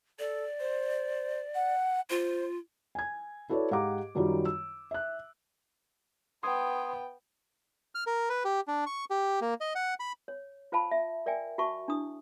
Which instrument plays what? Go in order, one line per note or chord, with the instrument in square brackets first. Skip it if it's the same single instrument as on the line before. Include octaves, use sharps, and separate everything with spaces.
[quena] A4 [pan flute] D5
[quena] C5
F#5
[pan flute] F4 [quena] C5
[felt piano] G#5 G#6
E4 F#4 A4 B4 C#5 D5
G#2 G4 F5 F#5 A#5 D6
F#2 D#3 F#3 G3 D#4 F4
E6
E5 F#6
[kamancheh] B3 G5 [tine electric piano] C6 D#6 G#6
[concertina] F6
A#4
B4
G4
D4
C#6
G4
A#3
D#5
F#5
B5
[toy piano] C#5
F4 C5 F5 A5 B5
E5
A#4 D5 E5 G5 G#5
F#4 E5 A5 C#6
D4 E4 D#6